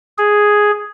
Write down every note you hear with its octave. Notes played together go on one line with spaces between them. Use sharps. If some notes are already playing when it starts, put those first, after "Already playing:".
G#4